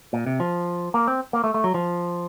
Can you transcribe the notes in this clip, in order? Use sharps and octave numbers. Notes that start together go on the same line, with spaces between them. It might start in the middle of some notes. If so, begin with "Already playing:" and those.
A#2
C3
F3
A#3
C4
A#3
A3
A3
F#3
F3